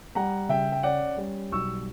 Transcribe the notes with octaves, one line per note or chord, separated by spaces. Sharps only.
G3 F#5 A#5
C#3 E5 G5
G5
C#4 D5 F#5
G3
B1 C#6 E6